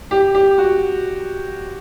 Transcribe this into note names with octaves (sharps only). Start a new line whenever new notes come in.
G4
G4
F#4